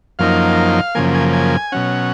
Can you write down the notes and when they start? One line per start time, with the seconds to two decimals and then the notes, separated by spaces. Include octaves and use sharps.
0.19 F#2 F3 A#3 D#4 F5
0.95 F#2 C#3 F3 A#3 G#5
1.15 G#5
1.33 G#5
1.72 B2 F#3 C#4 F#5